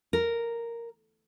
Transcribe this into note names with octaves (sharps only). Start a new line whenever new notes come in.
A#4